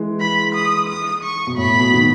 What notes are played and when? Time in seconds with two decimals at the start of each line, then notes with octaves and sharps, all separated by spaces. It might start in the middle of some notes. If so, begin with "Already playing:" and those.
Already playing: E3 G#3
0.20 B5
0.55 D#6
0.89 D#6
1.23 C#6
1.47 B2
1.57 A2 B5
1.79 B2
1.94 D#3